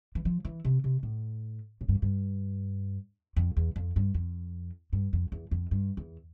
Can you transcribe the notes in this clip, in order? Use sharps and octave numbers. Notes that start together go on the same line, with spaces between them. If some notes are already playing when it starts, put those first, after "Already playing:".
E3
F3
E3
C3
C3
A2
A2
G2
F2
G2
F2
E2
F2
G2
F2
G2
F2
E2
F2
G2
E2